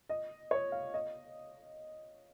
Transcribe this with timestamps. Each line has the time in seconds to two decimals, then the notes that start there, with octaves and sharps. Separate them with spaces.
0.09 D#5
0.51 C#5
0.72 F5
0.94 D#5